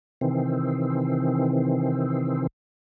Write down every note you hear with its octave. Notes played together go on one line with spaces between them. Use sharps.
C3 D#3 E3 C4